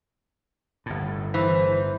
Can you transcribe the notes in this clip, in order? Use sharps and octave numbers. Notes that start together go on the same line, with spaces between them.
G1 A2
E3 C5